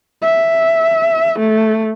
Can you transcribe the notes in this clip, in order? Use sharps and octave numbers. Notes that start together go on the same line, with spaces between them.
E5
A3